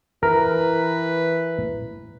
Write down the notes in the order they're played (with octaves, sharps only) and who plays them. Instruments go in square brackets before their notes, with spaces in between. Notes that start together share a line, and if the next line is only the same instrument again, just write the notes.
[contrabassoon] E3 [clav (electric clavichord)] A#4 [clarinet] B4